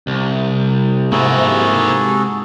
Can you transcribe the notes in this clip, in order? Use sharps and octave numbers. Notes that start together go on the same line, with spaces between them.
C2
G#2 C3 A#3 E4 F#4 G#4 A4